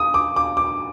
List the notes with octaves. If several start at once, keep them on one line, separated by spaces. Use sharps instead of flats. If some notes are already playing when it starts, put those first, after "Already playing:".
Already playing: D#6
D6
D6
D6